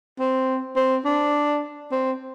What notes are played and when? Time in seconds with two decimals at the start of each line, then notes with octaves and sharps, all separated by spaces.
0.20 C4
0.76 C4
1.05 D4
1.92 C4